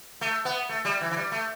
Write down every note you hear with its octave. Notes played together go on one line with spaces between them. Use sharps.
A3
B3
A3
G3
E3
E3
G3
A3